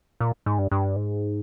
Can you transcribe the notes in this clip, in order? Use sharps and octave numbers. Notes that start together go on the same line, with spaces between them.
A#2
G#2
G2
G2
G#2